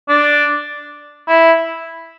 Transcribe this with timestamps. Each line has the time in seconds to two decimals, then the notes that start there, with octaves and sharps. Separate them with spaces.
0.09 D4
1.28 E4